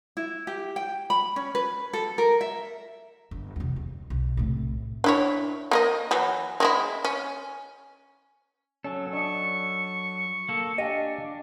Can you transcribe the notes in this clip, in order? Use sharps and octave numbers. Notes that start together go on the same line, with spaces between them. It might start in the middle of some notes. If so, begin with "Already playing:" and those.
E4
G4
G5
B5
C#4
B4
A4
A#4
E5
G1
E2 C3
D#2
B1
A2 C3
D4 E4 C#5
A#3 A#4 D#5
E3 F#3
G#3 C4 E4
C#4
F#3 C#4 A4
D4 D#5 C#6
A#3 A4
D4 G4 D#5 F5 G#5